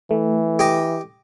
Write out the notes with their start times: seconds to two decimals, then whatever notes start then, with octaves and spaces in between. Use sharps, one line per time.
0.11 E3 A3
0.59 G4 D#5